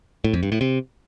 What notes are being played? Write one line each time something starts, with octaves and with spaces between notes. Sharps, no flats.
A2
F2
G2
A2
C3